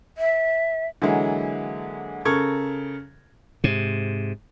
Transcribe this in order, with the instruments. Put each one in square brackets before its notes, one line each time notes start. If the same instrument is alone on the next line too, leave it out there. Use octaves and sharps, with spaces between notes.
[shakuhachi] E5
[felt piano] D3 E3 F#3 G#3 A#3
C#3 A4 A#4 C#6 G#6
[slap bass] G#2 C3